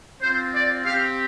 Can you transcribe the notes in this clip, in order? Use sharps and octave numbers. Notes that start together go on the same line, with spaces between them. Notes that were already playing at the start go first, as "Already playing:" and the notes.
C4 F4 C5
D5
C4 G4 F5